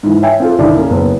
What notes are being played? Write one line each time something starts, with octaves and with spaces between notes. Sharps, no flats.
G#2 E3
C#5 E5 G5 G#5
C4 F4 A4
C2 G2 D3 D#3 G3 D5
A#3 C#4 A#4
F#1 B3